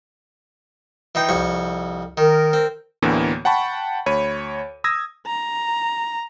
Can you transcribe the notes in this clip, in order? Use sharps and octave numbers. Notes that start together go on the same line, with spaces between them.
E3 D#4 G5
C2 F2 C#6
D#3 A#4
C4
D2 A2 D3 E3 A#3 B3
F#5 G5 A5 B5 C#6
D2 C#5 B5 D#7
D#6 E6 G#6 A#6
A#5